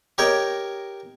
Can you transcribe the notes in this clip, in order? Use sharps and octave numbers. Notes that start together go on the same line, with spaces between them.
G4 A#4 C#5 D#5